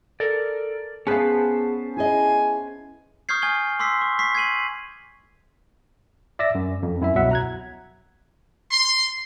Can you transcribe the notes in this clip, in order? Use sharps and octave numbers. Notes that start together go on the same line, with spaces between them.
A4 A#4 D5
B3 C#4 G#4 B4 C5 F5 A5
E4 G#4 D#5 G#5
C#6 D#6 F6 G6 G#6 C7
G#5 G#6 G7
C6 D6 E6 B6 C7
C#6
C#6 B6 C7
G#6 C7 D#7 F#7
D5 E5 D6 E6 A#6
F#2
F2
F#2 E4 E5
C2 B2 F#3 E5 F#5
A#5 F#6 G#6
C6